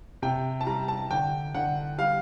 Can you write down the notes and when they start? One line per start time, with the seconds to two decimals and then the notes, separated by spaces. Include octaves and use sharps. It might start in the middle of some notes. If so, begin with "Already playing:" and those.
0.22 C3 G5
0.61 A5
0.67 G3 A#5
0.88 A5
1.10 D3 G5
1.54 D3 F#5
1.98 G3 F5